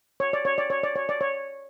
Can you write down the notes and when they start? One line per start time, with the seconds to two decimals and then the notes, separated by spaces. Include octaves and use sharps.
0.20 C#5
0.33 D5
0.45 C#5
0.58 D5
0.70 C#5
0.83 D5
0.95 C#5
1.09 D5
1.21 C#5